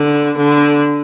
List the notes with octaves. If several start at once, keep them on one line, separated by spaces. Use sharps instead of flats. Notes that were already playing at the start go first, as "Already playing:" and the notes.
Already playing: D3
D3